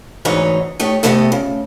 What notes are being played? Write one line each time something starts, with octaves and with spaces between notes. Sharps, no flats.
D2 G#2 E3 D#4 G#4 C#5
A3 D#4 G4 C#5
C3 A3 B3 G4 A4 D#5
C#3